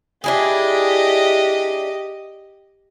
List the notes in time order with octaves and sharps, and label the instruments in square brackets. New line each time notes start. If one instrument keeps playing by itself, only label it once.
[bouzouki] D4 E4 G#4 [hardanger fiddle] G4 D#5